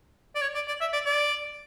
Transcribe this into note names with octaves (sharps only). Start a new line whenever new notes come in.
D5
C#5
D5
D5
E5
D5
D5